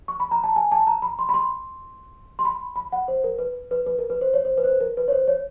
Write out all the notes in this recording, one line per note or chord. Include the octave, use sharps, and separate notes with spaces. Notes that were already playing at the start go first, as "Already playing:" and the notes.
C#6
B5
A#5
A5
G#5
A5
A#5
B5
C6
B5
C6
C6
B5
B5
F#5
C5
A#4
B4
B4
B4
A#4
B4
C5
C#5
C5
B4
C5
B4
A#4
B4
C#5
C5
C#5